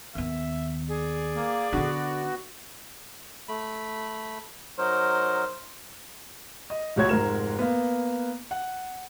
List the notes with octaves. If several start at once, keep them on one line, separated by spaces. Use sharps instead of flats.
D#2 B3 E5
G#4 D5
A#3
D3 B3 D4 F#4
A3 B5
F#3 D#4 A#4 C5
D#5
F1 C#2 F#4 C#5 G#6
F1 G#2 A#4 E7
A#3 B3
F#5